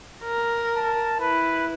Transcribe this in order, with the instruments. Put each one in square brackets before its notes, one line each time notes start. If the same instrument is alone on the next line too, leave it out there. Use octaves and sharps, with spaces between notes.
[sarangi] A#4
[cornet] A5
[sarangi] E4 [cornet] B4